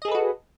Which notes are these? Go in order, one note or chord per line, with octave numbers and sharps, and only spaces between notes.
F#4 G#4 A4 B4 D#5